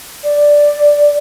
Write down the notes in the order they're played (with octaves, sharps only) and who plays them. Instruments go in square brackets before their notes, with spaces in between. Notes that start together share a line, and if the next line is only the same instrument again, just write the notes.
[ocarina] D5